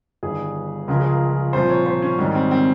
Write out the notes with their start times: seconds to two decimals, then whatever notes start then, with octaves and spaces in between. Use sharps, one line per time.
0.23 G1 G2 D#3 G#4
0.88 C#2 C#3 F3 A#4
1.00 G#4
1.12 A#4
1.53 C2 A#2 F3 C5
1.70 C#5
1.86 C5
2.02 C#4
2.18 G#1 G#2 D#3 G3 C#4
2.35 C4
2.51 C4